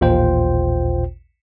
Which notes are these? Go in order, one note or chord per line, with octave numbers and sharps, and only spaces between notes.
A1 D#2 A#2 F4 C5 G5